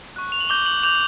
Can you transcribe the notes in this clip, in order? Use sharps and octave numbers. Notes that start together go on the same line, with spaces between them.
C#6 F#6
F7
F#7
D6 G6 G7
F#7
D6 G6 F7